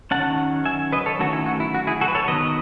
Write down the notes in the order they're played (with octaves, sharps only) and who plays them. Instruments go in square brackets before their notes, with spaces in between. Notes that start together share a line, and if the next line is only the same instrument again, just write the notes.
[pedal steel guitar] D#3 F#3 C#4 F#5 A5
E5 G#5
B4 D#5
A4 C#5
D#3 F#3 A3 C#4 F#4 A4
E4
F#4
E4
F#4
E4 G#4
F#4 A4
B4
A4 C#5
D#3 F#3 B3 B4 D#5